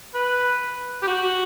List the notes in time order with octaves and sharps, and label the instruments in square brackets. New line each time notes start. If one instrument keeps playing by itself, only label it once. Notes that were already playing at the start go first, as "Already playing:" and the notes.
[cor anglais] B4
G4
F#4